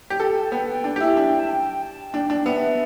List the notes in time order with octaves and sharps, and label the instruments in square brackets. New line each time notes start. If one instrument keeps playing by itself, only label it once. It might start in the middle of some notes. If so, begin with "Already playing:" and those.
[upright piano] G4
[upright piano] A4 [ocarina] G5
[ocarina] A5
[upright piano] B3 [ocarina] G5
[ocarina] G5
[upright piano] D4
G4
E4
D4
[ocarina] A5
G5
A5
[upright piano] D4 [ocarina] G5
[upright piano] D4
[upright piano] B3 [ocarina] E5